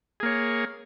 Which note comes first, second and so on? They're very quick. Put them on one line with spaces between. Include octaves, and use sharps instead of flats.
G#4 A#3 C#5